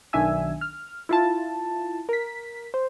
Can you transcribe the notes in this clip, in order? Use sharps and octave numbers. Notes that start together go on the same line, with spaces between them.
B1 D#3 D4 E5 G#5 E6
F6
E4 F4 A5
A#4 B6
C5